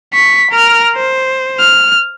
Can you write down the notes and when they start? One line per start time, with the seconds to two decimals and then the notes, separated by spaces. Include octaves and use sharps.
0.14 C#6 B6
0.51 A#4 F6
0.96 C5
1.60 F6